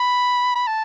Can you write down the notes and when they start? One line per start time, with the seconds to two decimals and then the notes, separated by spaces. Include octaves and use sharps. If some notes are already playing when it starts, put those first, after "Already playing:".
Already playing: B5
0.55 B5
0.67 A5